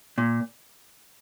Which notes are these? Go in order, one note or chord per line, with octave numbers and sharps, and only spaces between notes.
A#2